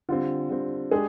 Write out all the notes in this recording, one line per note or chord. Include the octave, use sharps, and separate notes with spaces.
D3 G3 C4 F4
D3 G3 C4
G#3 D4 G4 G#4